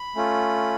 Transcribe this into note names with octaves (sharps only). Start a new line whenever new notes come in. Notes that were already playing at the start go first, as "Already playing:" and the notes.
Already playing: B5
A3 C#4 F4